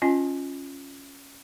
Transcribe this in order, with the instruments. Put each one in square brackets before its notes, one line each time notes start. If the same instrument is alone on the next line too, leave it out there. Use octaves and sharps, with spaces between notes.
[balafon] C#4 F4 D#5 G#5